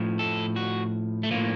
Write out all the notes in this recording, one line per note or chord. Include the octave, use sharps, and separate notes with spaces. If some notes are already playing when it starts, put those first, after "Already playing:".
Already playing: A2 F3
A4
F#4
A3
A2 F3 A#3